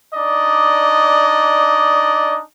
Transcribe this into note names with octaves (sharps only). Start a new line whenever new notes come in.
D4 D#4 D5 D#5